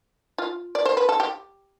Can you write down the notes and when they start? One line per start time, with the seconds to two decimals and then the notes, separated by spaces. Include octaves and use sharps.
0.38 F4
0.75 D5
0.85 C5
0.97 B4
1.09 A4
1.20 G4